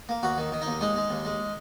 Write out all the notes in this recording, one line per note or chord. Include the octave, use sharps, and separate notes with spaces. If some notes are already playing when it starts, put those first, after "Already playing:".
A#3
D#2 F#4
D#3
D#3
D#2 D#4
G#3 D#4
G#3
D#2
G#3